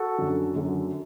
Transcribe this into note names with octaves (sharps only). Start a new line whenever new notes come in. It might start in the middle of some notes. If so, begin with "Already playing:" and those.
Already playing: F#4 A4
F#2 D3 F#3
F#2 D3 F#3